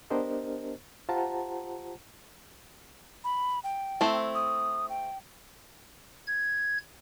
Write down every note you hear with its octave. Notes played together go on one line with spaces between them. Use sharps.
B3 D4 G4 A#4 C5 D#5
F4 G4 C5 F#5 A5 A#5
B5
G5
A3 C4 E4
D#6
G5
G#6